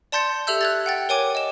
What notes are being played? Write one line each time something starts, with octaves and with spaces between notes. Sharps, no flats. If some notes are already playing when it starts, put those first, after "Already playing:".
D5 A5 C6 G6 A6 C#7
G4 A4 E5 E6 G6
F#6 G#6 A6
F#5 G5 A6
A#4 C#5 G5 G#5 D6
D#5 E7